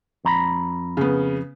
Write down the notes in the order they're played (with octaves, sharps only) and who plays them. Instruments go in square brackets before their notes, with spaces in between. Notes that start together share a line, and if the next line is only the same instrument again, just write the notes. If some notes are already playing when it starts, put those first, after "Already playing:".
[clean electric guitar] F2 A#5 B5
[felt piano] C#3 B3